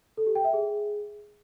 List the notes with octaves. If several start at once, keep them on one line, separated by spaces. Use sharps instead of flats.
A4
G4
G5
E5
G#4